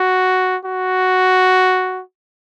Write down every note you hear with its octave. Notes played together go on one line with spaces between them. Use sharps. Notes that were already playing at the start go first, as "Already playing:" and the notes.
Already playing: F#4
F#4